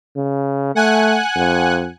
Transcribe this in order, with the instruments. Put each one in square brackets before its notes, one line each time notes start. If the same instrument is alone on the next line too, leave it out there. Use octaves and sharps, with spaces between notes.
[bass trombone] C#3
[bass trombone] A3 [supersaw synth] F#5 G#5 F#6
[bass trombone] F2